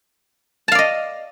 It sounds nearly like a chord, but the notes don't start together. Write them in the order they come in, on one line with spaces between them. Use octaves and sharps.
A5 F5 D5 D#5